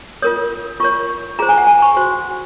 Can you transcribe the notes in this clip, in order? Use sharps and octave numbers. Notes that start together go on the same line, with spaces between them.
F4 A#4 C#5 D#6
F4 A#4 C#5 C#6
F4 G#4 C5 A#5
G#5
F#5
G#5
C#6
F#4 C5